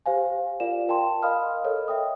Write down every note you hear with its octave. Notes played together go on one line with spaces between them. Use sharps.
G4 C5 F5 G#5
F4 A#4 D5 F5 E7
A#4 G5 A5 C6
A#4 D#5 F5 B5 D#6 F6
A4 A#4 C#5 D#5
E5 G5 D#6